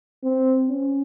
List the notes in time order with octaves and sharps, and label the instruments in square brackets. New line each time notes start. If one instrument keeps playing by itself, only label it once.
[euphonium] C4
C#4